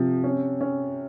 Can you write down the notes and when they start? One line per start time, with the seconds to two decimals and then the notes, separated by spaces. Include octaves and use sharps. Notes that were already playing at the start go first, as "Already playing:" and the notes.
Already playing: C3 F3
0.24 C#4
0.61 C#4